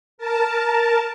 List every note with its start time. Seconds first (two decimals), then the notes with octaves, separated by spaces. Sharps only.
0.18 A#4 A5